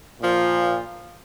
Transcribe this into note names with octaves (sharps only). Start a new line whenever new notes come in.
A#2 F3